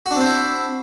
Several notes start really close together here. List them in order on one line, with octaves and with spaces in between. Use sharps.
F#4 D4 C4 C5 E4